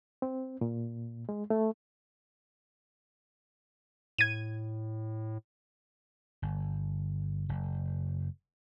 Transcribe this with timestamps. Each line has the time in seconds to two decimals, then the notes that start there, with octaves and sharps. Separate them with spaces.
0.22 C4
0.61 A#2
1.29 G#3
1.50 A3
4.18 A2 G#6 D#7
6.42 G1
7.49 F#1